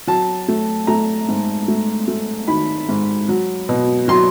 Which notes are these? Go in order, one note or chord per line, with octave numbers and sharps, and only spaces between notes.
F#3 A5
A3
A3 A#5
G#2
A3
A3
D#3 B5
G#2
F#3
B2
F#3 C6